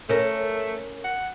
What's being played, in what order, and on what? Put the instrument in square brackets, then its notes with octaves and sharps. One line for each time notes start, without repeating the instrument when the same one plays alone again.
[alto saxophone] A3 [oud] C#4 A#4
[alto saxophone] F#5